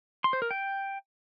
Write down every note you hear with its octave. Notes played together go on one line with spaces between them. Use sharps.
C6
C5
A#4
G5